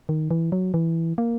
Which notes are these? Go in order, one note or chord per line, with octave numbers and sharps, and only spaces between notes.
D#3
E3
F#3
E3
A#3